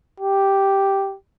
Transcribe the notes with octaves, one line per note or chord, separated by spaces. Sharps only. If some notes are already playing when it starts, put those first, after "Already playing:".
G4